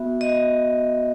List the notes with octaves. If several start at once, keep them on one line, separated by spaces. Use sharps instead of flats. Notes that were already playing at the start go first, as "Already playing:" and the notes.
Already playing: B3 F#4 E5
D#5